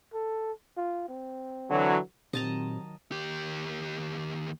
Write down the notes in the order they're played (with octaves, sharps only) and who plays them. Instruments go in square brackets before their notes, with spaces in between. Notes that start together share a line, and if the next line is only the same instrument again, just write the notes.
[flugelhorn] A4
F4
C4
[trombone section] D3 E3 F#3
[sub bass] A#2 [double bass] D#3 F#3 [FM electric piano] C4 G4 [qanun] D#5 A5 A#5
[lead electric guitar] D#2 G4